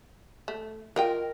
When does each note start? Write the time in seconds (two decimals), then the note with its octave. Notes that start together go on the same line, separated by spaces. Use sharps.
0.48 A3
0.96 F4 A#4 D#5 G5